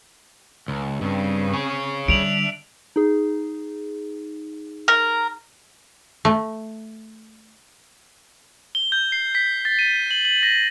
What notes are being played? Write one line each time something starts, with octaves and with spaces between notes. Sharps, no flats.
C#2
G2 C#3 C4
G#4 C#5
D3 G3 D4 E5 D7 F7 F#7
D#4 G#4
A#4
A3
G7
G6
C7
B6
A6
D#7
F#7
F#7
A#6